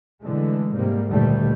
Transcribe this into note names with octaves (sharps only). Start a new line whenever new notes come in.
D3 E3 G#3 A3
G#2 C3 G3 A#3
D2 G2 A#2 D#3 G3 A3